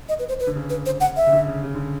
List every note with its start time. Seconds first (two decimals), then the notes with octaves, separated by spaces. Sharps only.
0.09 D#5
0.19 B4
0.29 C5
0.40 B4
0.47 D3
0.55 C#3
0.70 B4
0.86 C5
1.00 F#5
1.17 E5
1.27 C#3
1.32 D3
1.48 C#3
1.63 C#3
1.75 D3